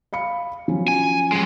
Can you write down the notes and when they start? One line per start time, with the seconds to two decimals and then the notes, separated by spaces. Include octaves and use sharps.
0.13 F5 B5 C#7
0.68 F3 F#3 C#4
0.88 G#5
1.32 F#3 G#3